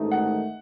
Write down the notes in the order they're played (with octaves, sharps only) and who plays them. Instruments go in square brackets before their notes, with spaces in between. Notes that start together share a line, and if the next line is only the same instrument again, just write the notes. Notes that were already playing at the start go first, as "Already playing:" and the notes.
Already playing: [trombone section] A1 G#2 D#3 A3 D#4
[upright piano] F#5